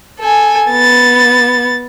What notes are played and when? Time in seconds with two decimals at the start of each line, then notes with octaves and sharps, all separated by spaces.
0.19 A4 G#5
0.71 B3 A6